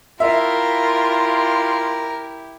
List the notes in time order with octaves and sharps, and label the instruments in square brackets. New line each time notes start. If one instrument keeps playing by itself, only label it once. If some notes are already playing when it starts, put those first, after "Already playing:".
[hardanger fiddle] E4 G4 [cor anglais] F4 [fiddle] A#4 [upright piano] E5